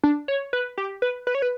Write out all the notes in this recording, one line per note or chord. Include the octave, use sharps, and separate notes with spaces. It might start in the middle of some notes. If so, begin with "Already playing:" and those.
D4
C#5
B4
G4
B4
B4
C#5
B4